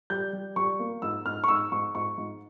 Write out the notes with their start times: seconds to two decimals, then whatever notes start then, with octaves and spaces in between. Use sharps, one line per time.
0.10 G3 G6
0.33 G3
0.56 G3 C#6
0.79 A#3
1.02 G#2 E6
1.26 G#2 F6
1.44 C#6
1.48 G#2 E6
1.72 G#2 C#6
1.95 G#2 C#6
2.18 G#2